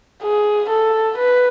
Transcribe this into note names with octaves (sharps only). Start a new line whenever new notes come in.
G#4
A4
B4